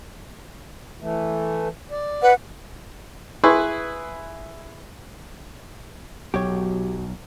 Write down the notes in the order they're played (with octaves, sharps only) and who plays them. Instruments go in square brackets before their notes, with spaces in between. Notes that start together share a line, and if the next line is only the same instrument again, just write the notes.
[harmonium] E3 A3
D5
[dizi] B4 [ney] F#5
[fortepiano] E4 G#4 B4 C6 C#6
[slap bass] B1 [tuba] F#3 [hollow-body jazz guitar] G4 C#5